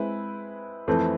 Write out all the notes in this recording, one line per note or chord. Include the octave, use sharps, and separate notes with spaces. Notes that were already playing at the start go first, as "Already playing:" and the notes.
Already playing: G#3 C4 E4 B4
F2 E3 A3 C4